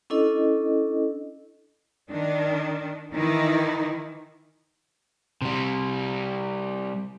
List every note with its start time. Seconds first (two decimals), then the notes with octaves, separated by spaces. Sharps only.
0.10 C#4 D4 E4 A4 D#5
2.08 D#3 D4
3.12 D#3 E3 D#4 E4
5.42 C3 G3